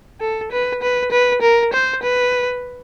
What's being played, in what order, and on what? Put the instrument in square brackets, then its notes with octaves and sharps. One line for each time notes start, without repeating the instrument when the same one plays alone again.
[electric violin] A4
B4
B4
B4
A#4
C5
B4